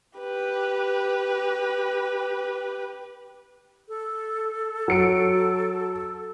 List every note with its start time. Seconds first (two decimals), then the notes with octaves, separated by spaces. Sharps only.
0.19 G4 B4
3.88 A4
4.88 F#3 C#7 D7